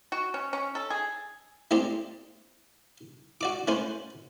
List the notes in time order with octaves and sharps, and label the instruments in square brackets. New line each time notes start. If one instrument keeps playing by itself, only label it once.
[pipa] F#4
C#4
C#4
A4
G#4
[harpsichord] A3 C4 D4 G4
F#4 D5 D6
A3 C#4 B4 C5